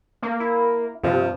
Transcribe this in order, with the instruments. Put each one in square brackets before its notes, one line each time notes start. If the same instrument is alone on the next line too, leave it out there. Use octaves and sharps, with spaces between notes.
[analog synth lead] A#3
[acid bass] E4
[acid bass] G2 [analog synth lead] C3 [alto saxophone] F3